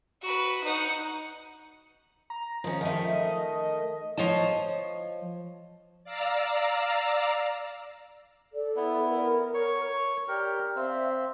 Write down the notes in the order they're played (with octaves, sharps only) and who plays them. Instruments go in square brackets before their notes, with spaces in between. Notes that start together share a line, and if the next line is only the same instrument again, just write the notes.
[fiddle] F#4 B4
D#4 F#5
[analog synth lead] A#5
[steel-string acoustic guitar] D#3 C#4 [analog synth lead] F3
[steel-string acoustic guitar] D#3 A3 [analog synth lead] F3
[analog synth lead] D#5
[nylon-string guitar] F3 C#5 D#5 A5
[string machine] D5 F5 A#5 E6
[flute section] A4 D5
[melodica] B3 E4
[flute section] A#4
[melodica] C#5 C#6
[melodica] G4 A#4 [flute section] D5
[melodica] C4 [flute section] E5 F5